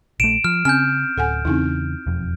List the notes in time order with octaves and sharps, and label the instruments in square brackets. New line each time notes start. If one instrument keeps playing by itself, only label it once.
[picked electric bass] A#1 A3 [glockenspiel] D7 E7
[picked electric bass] F3 [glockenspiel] F6
[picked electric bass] C#3 [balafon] C4 C#4 G#5 [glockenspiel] F6 G6
[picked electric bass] D1 [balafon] A4 F#5 G#5
[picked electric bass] E2 C#3 [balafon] C4 D#4 E4
[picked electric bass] E1 F2